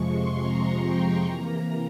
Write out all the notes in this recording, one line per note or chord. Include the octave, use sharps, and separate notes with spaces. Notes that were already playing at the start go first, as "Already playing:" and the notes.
Already playing: F2 C3 F3 G#3 C#6
C6
A#5
G5
C3 E3 A#3 A#5